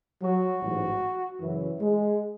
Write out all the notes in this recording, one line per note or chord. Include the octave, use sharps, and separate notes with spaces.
F#3 F#4
A1 G#2 F#3
F#2 C#3 E3 F#3 E4
G#3